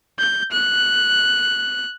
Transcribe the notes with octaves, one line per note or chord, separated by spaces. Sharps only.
G6
F#6